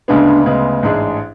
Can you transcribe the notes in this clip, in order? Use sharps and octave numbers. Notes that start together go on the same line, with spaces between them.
D2 C#3 G#3 B3 D4
D2 C#3 G#3 B3
A1 G#2 G#3 D4 G#4